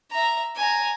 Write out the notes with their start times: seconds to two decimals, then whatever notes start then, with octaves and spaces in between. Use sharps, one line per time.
0.11 E5 A#5
0.56 G#5 A#5